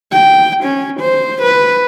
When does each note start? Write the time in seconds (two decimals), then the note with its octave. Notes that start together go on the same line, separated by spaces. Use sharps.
0.12 G5
0.64 C#4
1.01 C5
1.43 B4